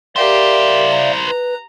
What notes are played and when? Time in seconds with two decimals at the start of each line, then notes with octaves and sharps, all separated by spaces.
0.16 E4 G4 A#4 C5 D5 E5 F5
0.88 A#5
1.26 B4